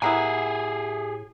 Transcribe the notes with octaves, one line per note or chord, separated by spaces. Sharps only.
A2 A#3 B3 E4 G4 G#4 G#5